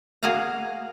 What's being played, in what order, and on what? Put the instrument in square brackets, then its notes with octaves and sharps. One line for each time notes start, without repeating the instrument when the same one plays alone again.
[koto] A#3 F#4 G#4 F5 F#5 A#5